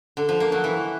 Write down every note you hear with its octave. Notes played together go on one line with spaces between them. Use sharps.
D3
F3
A#3
F#3
E3